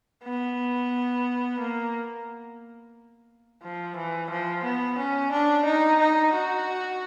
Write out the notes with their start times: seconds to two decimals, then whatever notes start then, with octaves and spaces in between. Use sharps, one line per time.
0.24 B3
1.60 A#3
3.63 F3
3.96 E3
4.30 F3
4.63 B3
4.98 C#4
5.32 D4
5.65 D#4
6.00 D#4
6.33 F#4